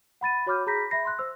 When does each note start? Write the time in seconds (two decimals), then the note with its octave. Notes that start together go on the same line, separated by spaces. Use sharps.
0.21 F#5 B5 A6 D#7
0.46 F#4 C#5 B5 D6 F6 G6
0.67 G#4 A#5 B5 G6 A#6 B6
0.91 E5 B5 A#6 C7
1.05 C6 F#6
1.19 C5 E6